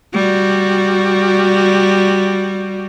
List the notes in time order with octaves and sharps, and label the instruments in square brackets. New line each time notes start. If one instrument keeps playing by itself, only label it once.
[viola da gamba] G3 F#4